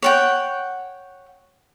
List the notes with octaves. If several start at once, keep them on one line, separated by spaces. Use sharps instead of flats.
C#5 F#5 G5